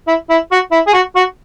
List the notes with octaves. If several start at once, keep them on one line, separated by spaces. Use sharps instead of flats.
E4
E4
F#4
E4
G#4
F#4
F#4